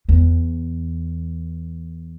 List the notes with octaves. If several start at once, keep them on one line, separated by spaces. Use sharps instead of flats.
E2